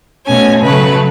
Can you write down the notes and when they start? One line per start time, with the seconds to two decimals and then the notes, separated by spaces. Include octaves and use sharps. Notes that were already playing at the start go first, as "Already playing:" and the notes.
0.27 B2 A3 C#4 G#5
0.64 C#3 F#3 A3 B4